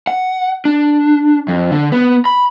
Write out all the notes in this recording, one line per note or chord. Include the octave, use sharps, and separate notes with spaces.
F#5
D4
F2
D3
B3
B5